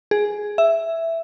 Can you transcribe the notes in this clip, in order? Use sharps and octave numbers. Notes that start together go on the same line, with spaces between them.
G#4
E5